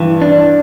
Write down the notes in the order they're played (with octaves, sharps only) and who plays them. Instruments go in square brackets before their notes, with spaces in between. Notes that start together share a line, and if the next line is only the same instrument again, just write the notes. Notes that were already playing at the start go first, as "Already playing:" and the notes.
Already playing: [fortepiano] G2 [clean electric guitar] E3
[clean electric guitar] D4